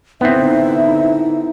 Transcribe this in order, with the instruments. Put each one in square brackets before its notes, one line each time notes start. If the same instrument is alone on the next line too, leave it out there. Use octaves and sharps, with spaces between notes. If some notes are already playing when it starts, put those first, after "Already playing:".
[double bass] D3 E4 [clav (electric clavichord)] B3 C4 [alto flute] D#4 [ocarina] E5